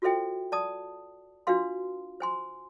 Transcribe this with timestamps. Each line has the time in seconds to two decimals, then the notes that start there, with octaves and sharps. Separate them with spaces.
0.02 F4 F#4 A4 C5 E5 G5
0.52 D5 A5 D#6
1.47 D4 F4 F#4 B4 F5 C6
2.20 C5 G#5 C6